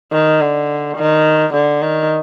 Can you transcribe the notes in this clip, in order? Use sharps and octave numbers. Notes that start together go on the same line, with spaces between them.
D#3
D3
D#3
D3
D#3